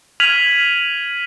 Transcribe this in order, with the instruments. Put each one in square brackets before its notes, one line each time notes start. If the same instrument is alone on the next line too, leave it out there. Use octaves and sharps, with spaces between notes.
[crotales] F6 G#6 B6 D#7 F7 F#7